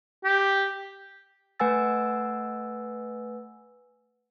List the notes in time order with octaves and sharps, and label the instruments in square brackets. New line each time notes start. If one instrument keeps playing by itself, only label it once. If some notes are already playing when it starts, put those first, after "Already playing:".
[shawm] G4
[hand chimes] A3 B4 F#5 G#5 E6 A6